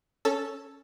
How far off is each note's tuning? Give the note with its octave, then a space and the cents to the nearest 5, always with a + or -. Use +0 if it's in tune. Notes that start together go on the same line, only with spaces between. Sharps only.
C#4 +0 A4 +0